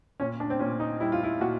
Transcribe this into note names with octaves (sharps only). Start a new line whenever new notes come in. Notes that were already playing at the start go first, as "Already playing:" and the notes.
A#2 C#4
D4
C4
A#2 C#4
D#4
G3 E4
F4
E4
A#2 F#4